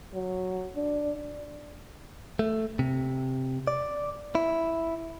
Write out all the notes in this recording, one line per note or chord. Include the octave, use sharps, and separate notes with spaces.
F#3
D4
A3
C3
D5
E4